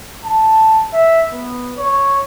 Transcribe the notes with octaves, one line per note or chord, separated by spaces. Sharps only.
A5
E5
B3
C#5